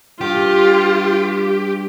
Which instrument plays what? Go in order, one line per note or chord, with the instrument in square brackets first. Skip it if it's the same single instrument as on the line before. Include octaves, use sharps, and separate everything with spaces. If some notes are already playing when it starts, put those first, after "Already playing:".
[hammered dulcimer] G2 [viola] F4 [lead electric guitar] G4